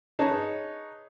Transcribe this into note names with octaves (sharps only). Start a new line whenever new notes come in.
D#4 G#4 B4 C#5 A5